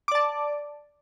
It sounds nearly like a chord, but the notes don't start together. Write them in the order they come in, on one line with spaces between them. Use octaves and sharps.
D6 D5 A5